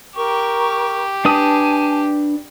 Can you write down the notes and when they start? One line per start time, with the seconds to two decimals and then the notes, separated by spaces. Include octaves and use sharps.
0.17 G4 A#4 C#6
1.25 D4 B4 G#5 A5 D#6